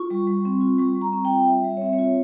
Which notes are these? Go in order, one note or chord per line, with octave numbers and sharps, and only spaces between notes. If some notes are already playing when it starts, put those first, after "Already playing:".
Already playing: F4 C#6
G3
G3
C4
F4
G3 C#6
G3
A#5
C4
F4 G5
G3 E5
G3
E5
C#5
C4 E5
C#5
F4